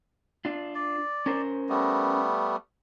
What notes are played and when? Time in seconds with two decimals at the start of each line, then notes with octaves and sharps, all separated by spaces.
0.45 D4 F4
0.75 D5
1.26 C#4 A#4 C5
1.69 G3 A3 B3